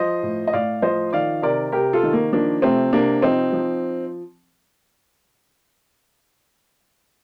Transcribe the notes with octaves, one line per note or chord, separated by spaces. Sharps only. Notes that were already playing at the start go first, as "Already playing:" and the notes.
Already playing: F3 C5 D#5
A2
D#5
A2 D5 F5
F3 C5 D#5
D#3 D5 F5
C3 A#4 D5
C3 G4 A#4
F4 A4
D#3
A#3
F3 A#3 D4
C3 A3 C4
C3 A#3 D4
F3 C4 D#4
F3